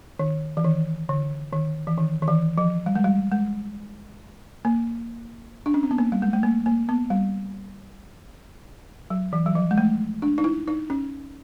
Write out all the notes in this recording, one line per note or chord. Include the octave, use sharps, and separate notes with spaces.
D#3
E3
D#3
D3
D#3
E3
D#3
D#3
E3
F3
G3
G#3
G3
G#3
A#3
D4
C#4
C4
B3
A#3
G3
G#3
A3
A#3
A#3
B3
G3
F#3
E3
F#3
F3
G#3
A3
D4
D#4
E4
D#4
C#4